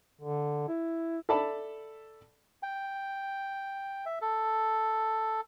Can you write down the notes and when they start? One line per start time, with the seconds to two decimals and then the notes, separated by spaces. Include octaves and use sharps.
0.21 D3
0.68 E4
1.29 A4 D5 E5 A5 B5
2.63 G5
4.06 E5
4.21 A4